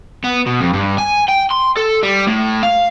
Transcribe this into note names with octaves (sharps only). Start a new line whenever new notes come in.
B3
B2
F2
G2
G#5
G5
C6
A4
G3
A2
F5